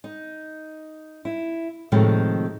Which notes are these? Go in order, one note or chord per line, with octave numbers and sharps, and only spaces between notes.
D#4
E4
A2 C3 D#3 F3 G#3 D#4